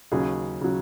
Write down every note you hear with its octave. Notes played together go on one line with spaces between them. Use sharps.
D#2 C#3 F#3 G#4
C#3 F#3